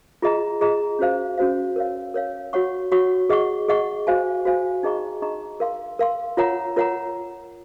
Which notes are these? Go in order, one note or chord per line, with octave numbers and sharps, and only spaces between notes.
F4 G#4 D#5 A#5
F4 G#4 D#5 A#5
C#4 F#4 C5 F5
C#4 F#4 C5 F5
A#4 C#5 F5
A#4 C#5 F5
F#4 C#5 F#5 C#6
F#4 C#5 F#5 C#6
G#4 D#5 F#5 C#6
G#4 D#5 F#5 C#6
F#4 C5 F5 G#5
F#4 C5 F5 G#5
D#4 G#4 D#5 A#5 C#6
D#4 G#4 D#5 A#5 C#6
A#4 F5 C6
A#4 F5 C6
F4 A#4 C#5 F#5 A#5
F4 A#4 C#5 F#5 A#5